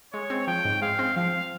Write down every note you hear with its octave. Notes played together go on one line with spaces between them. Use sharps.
G#3 C#5
C4
F3 G5
G#2
G#3 F5
C4
F3 F5